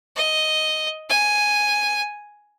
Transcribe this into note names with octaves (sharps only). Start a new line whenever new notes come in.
D#5
G#5